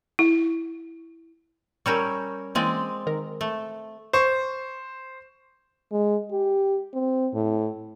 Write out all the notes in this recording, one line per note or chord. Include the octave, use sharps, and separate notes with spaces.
E4
G3 C#4 A#4 C#6 E6 G6
E3 G#3 A#3 C4 C#4 D5
D#3 A#4
A3
C5 C#6
G#3
G4
C4
A2